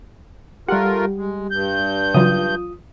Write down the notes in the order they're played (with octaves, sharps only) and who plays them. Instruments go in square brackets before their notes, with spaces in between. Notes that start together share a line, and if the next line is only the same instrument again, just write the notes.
[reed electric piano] G3 G4 [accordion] A3 F4 A#4 [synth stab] F#5
[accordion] G#3
G2 G6
[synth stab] C#3 E3 F#3 [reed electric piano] F4 D#6